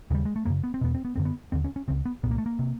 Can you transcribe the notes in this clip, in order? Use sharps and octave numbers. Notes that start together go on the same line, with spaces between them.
D#2 C#3 G3
G#3
A3
F#2 C#3 A#3
B3
C4
E2 B2 B3
C4
B3
F#2 D3 C4
B3
D#2 D3 C4
C#4
C#4
C#2 C#3 C4
B3
C2 A#2 B3
A#3
A3
A#3
C3